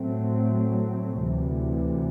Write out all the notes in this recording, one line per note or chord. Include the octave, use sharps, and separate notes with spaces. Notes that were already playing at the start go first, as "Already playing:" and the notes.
Already playing: A2 F#3 A3 C4
D2 C3 E3